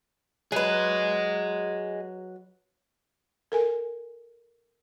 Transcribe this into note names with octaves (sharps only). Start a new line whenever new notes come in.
F#3 G#4 B4 D#5
A4 A#4 G#5